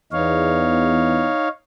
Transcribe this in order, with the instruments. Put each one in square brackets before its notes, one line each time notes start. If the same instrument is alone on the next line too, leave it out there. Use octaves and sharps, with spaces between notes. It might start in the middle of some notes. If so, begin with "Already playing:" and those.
[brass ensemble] E2 [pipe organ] D#4 C#5 F5